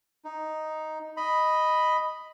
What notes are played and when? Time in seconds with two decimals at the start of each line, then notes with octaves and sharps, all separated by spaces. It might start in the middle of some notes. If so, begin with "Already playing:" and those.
0.25 D#4
1.17 D#5 B5